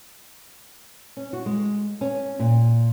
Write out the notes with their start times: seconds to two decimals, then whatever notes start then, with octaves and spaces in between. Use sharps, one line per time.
1.17 C#4
1.33 F#4
1.46 G#3
2.01 C#4
2.39 A#2